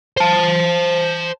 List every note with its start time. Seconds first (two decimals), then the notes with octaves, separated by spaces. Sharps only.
0.17 C5 A5